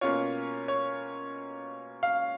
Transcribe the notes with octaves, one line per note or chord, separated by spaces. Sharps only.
B2 A#3 C#4 F4 C#5
C#5
F5